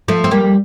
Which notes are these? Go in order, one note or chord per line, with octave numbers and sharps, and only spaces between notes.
F3 A3
C4
G3 A#3